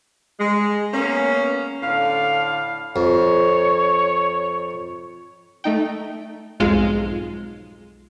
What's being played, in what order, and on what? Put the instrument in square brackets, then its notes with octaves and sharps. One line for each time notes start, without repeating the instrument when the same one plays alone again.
[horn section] G#3
A#3 B3 C#4
A2 D3 F5
[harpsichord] F2 [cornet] C#5
[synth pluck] A3 D#4 G5
B1 F2 G#2 G#3 F4 F5